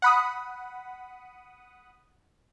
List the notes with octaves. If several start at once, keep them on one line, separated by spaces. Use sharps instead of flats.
F#5 B5 D#6